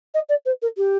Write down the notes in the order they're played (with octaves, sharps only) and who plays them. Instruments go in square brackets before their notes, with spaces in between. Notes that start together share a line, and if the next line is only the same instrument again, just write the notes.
[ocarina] D#5
D5
C5
A#4
G4